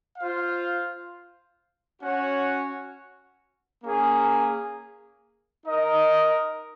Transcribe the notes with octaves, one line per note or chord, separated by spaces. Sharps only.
F4 C5 F5
C#4 F#4 C#5 F#5
A#3 C#4 G#4
D#4 A#4 D#5